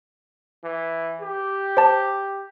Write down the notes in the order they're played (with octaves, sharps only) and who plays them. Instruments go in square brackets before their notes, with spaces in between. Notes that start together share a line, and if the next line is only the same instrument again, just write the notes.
[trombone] E3
G4
[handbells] C5 A5